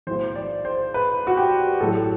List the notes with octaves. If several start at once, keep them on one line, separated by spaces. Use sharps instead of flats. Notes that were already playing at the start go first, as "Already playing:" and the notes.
B1 A2 E3 C5
D5
C5
B4
F#4
G4
A1 A2 F#3 A4